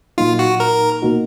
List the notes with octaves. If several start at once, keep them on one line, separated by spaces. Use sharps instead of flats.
A#2 F#3 A#3 D#4 F4
F#4
A#4
B2 A#3 D#4 F#4